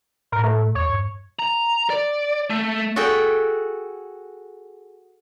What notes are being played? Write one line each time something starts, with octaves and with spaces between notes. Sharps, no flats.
A2 A#4
A3
E2 C#5
G2
A#5
D5
A3
F#4 G#4 A4 E5 G5